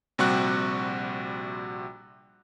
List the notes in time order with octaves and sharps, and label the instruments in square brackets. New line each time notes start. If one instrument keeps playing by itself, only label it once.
[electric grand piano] A#1 C3 G3 F#4 C#6 F#6